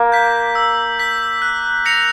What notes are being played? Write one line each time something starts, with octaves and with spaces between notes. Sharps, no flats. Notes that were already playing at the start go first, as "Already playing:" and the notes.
Already playing: A#3
G6 B6
E6
G6 B6
F#6
A#6 C#7 F7